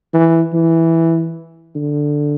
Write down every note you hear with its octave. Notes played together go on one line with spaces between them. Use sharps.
E3
E3
D3